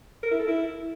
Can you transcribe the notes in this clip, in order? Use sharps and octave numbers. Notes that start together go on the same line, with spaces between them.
A#4
E4
A4
E4